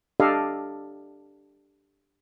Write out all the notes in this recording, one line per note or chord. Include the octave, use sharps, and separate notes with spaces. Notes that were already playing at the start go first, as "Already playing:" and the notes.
D4 G4 A4 D5 D#5 F5